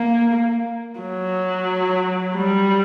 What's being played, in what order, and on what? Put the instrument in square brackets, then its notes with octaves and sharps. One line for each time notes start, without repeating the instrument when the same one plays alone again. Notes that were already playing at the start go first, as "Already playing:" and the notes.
Already playing: [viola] A#3
F#3
G3